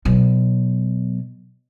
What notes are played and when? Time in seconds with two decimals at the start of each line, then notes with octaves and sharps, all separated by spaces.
0.05 B2 F#3